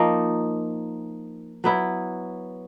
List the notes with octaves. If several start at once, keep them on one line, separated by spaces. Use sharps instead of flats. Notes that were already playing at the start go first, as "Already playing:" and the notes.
Already playing: F3 A#3 D#4
F#3 B3 E4